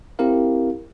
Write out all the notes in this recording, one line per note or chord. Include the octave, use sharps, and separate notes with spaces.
C4 E4 G4 A#4 F5